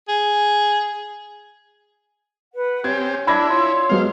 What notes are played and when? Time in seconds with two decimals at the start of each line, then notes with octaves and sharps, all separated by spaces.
0.09 G#4
2.53 B4 F#5
2.84 C4 C#4 G4 G#6
3.27 D4 E4 B5 G#6 A#6
3.49 F4 C#5
3.89 F#3 G#3 B3 C5 F5